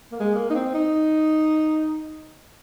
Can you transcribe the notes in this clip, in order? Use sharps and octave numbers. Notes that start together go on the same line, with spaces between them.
A#3
G#3
A#3
D#4
C4
D#4